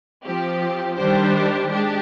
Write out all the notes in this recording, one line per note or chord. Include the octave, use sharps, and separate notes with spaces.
F3 C4 G4
D#3 G3 D4 G4 C5
G#3 D4 G4